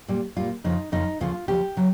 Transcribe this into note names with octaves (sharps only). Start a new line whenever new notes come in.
A#2 G3
A#2 G3 F4
F2 C#3 F3 D#4
F2 C#3 F3 D#4
D2 C#3 F3 F4
D2 C#3 F3 G4
C#3 F#3